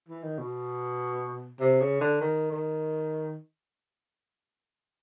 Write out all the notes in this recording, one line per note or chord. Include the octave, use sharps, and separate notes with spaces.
E3
D#3
B2
C3
C#3
D3
D#3
D#3